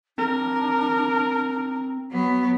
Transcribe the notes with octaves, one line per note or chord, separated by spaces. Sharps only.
C4 D4 A#4
F#3 B3